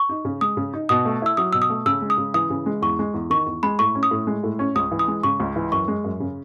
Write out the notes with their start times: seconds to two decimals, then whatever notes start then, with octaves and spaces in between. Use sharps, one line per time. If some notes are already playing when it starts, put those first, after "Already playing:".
Already playing: C#6
0.09 D#4
0.25 C#3
0.41 G#3 D#6
0.57 C#3
0.74 D#4
0.89 B2 D#6
1.05 A3
1.22 E4 E6
1.37 F#3 D#6
1.53 B2 E6
1.62 D#6
1.70 A3
1.86 C#3 E6
2.02 G#3
2.10 D#6
2.18 C#3
2.34 E3 D#6
2.50 C#3
2.66 G#3
2.82 E2 C#6
2.99 G#3
3.14 E2
3.30 D#3 C#6
3.46 E2
3.63 G#3 B5
3.79 A2 C#6
3.95 C#4
4.03 D#6
4.11 A2
4.27 G#3
4.43 A2
4.59 C#4
4.75 C#2 D#6
4.91 E3
4.99 D#6
5.08 G#3
5.23 C#3 C#6
5.40 C#2
5.56 E3
5.72 F#2 C#6
5.88 G#3
6.04 F#2
6.20 C#3